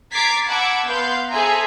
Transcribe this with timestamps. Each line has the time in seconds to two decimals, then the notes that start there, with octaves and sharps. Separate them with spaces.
0.11 A#5 D6 G#6 A6 B6 C7
0.46 F#5 A5 B5 D6 E6 G#6
0.85 B3 B4 F5 C6 G6
1.30 G#4 A4 C5 E5 G#5 A#5